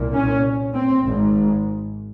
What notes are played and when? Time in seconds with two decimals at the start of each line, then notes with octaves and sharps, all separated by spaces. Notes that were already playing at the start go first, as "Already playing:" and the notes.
Already playing: C2 A#2
0.14 C#4
0.74 C4
1.05 G#1 G#2